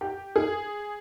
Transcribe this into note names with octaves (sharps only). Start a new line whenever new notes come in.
G4
G#4